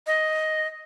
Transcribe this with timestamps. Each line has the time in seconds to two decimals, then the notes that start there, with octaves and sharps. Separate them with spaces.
0.07 D#5